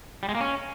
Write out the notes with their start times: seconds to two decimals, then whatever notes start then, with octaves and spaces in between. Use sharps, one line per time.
0.23 G3
0.29 G#3
0.35 A#3
0.41 C#4